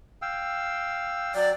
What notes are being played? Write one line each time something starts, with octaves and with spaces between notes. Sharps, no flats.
F5 G5 E6
F#3 D5 G5